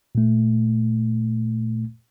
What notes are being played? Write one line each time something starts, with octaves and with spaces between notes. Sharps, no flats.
A#2 A3